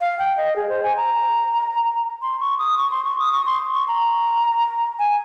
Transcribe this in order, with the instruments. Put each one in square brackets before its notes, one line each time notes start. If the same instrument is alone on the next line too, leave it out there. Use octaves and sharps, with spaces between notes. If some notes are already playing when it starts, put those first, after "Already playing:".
[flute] F5
G5
D#5
G#4
C5
G#5
A#5
C6
C#6
D#6
C#6
C6
C#6
D#6
C#6
C6
C#6
A#5
G#5